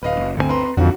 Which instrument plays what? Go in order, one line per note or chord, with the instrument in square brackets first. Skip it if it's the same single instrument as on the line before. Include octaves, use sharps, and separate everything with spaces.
[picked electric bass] D1 [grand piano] B4 D#5 F5
[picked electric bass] F#1
[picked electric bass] G1 C3 C4 [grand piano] D2 G#5
[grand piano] B4 A#5 C6
[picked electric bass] A#1 D3 D#3 [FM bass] F2 [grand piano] F#4